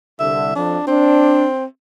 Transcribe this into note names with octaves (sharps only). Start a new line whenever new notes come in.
C2 D3 E5
F2 D4
C4 D4